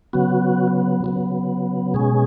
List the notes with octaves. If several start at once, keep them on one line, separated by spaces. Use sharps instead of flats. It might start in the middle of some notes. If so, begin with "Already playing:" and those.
C#3 F#3 B3 F#4
C#3 F#3 B3
B2 G#3 C#4 G#4